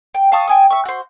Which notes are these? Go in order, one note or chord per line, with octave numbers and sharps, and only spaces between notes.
G5
F5 A5 C#6 D#6
G5 G#5 D#6
E5 C#6
F#4 C5